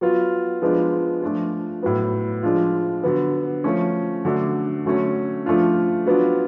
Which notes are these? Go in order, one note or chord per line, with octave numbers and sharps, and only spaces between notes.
F#3 B3 F4
F3 G#3 B3 D4 F4
F3 A3 D4 F4
A2 F#3 B3
F3 G#3 D4 F4
D3 F#3 B3
F3 A3 C#4
D3 F#3 A3 D4
D3 F#3 A3 C#4
F3 A3 D4 F4
F#3 B3 D4 F4